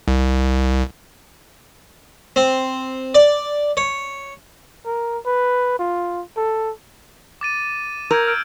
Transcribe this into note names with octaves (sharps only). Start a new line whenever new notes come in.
C2
C4
D5
C#5
A#4
B4
F4
A4
D6 A6 D#7
A#4 E6 G6 G#6
E6 F6 D7